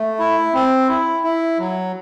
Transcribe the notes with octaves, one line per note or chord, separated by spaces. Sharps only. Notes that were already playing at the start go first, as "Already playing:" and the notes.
Already playing: A3
E4
C4
E4
E4
F#3